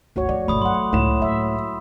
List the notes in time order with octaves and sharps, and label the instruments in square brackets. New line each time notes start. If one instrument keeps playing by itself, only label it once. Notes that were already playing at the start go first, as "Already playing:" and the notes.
[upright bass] G1 C#2 [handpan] A3 F#4 C#5
[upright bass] F2 [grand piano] D5
[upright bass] G1 A#2 [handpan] A3 [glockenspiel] B5 D#6
[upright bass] E3 [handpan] F#3 F#5 [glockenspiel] C6
[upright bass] C#2 [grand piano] A2 E7
[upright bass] A#3 [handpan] E5